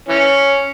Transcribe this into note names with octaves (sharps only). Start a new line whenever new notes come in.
E3 C#4